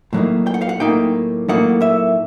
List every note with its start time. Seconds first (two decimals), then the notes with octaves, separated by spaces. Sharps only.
0.13 A2 F#3 A#3 D#4
0.47 G5
0.54 F#5
0.62 F5
0.69 F#5
0.80 A2 F#3 A#3 D#4 G5
1.48 A2 F#3 A#3 D#4 F#5
1.82 E5